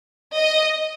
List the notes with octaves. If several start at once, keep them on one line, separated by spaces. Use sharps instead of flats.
D#5